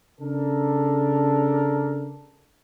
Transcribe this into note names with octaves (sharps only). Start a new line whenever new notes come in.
C#3 D4 A4 A#4